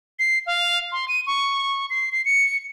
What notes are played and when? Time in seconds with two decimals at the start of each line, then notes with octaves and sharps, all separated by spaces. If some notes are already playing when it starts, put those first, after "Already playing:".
0.19 C7
0.46 F5
0.92 C6
1.08 D#7
1.27 C#6
1.90 C7
2.12 C7
2.25 C#7